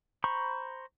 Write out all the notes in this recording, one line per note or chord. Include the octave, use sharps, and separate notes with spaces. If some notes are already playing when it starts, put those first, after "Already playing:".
C5 A#5 B5 C#6